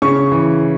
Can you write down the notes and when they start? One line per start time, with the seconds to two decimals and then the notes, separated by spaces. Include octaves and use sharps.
0.02 C#3 C#6
0.32 E3